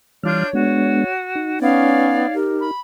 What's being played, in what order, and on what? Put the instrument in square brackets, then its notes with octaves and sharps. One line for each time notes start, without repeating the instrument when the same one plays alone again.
[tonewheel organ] E3 G3 F6 [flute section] D4 F4 G6 [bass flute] C#5
[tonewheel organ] G#3 B3 D4 [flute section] F#4
[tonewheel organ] D#4
[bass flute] B3 [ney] C#4 [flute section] C#5 D5 F5
[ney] G4 [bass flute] A#4
[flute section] B5